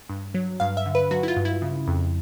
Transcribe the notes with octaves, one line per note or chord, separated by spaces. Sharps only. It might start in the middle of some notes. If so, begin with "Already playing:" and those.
G2
F#3
G2 F5
E5
D3
B4
F#3 F#4
E4
F4
G2
E4
C#3
F2